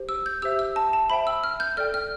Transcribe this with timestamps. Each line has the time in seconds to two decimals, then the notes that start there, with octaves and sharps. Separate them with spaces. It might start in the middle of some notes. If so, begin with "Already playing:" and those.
Already playing: G4 C5
0.09 E6
0.26 G6
0.42 G4 C5 E5 E6
0.59 E6
0.76 A5
0.93 A5
1.10 C5 E5 G5 B5
1.27 E6
1.44 F6
1.60 G6
1.77 A4 D5 G5 F6
1.94 F6